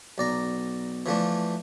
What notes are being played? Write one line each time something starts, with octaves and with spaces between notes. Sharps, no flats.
B1 D5 A#5
E3 F3 A3 D4